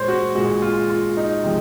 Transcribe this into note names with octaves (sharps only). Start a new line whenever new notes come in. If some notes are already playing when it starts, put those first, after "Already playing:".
Already playing: A#2 G#3 C5 C#5
F#4
A#2 G#3 F#4
F4
F4
D#4
C3 F3 G#3